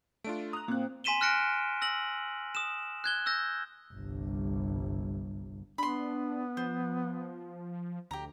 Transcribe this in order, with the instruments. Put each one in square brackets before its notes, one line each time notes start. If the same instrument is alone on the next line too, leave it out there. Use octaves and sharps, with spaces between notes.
[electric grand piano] A3 D4 F4 [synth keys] D7
[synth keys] A#5 [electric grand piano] D#6 F#6
[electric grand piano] A#2 F#6 [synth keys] A#3 [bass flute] C4
[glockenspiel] G#5 C6 B6 D#7 E7 G7
F6 F#6 A#6 C#7 D7
E6 A#6 F#7
D#6 E7
F#6 G#6 G7
E6 G6 A#6
[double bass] G1 C2
[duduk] B3 [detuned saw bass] D4 [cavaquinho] B5 C6
[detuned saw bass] F3 [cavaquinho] C5
[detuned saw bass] D2 [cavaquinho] G4 A#5